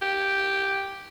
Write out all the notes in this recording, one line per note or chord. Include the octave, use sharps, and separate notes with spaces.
G4